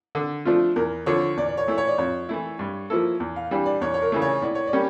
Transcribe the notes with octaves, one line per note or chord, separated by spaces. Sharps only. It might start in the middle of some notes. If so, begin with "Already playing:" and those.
D3
F3 A3 D4 F4
E2 A#4
D3 F3 C#5
E2 D5
D5
C#5
E3 A3 E4
C#5
D5
F2 C#5
E3 A3 E4
G2
F3 A#3 E4 A4
E2
F5
E3 G3 D4
D5
E2 C#5
C#5
A#4
C#3 E3 A3
C#5
A2 D5
C#5
D5
G3 A#3 C#4 G4